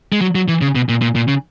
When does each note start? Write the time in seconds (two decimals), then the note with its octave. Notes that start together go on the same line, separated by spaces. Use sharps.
0.12 G#3
0.21 F#3
0.35 F#3
0.48 E3
0.61 C#3
0.75 B2
0.89 A#2
1.01 A#2
1.15 A#2
1.28 C#3